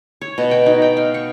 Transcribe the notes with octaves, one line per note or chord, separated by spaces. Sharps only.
C#5
B2
G5
D#4
G5
F5
C#6